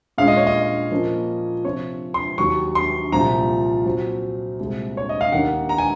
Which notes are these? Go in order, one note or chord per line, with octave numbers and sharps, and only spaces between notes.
A#2 G#3 C#4 F5
D#5
C#5
D#5
A#2 F3 A#3 C#4
C3 F3 C4 C#5
C6
D#2 D#3 F#3 C#6
C6
C2 A#2 F3 A#5
A#2 F#3 C4
C2 A#2 G#3 C4
C#5
D#5
F5
D#2 D#3 A#3 C#4 F#5
A#5
G#5